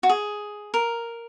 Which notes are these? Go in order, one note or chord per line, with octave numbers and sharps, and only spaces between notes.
F#4
G#4
A#4